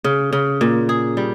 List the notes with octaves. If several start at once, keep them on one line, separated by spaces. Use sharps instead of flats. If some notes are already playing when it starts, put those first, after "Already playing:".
C#3
C#3
A#2
G#4
G3